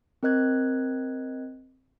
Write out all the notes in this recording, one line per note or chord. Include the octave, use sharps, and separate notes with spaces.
C4 A#4 D#5 F#6 G#6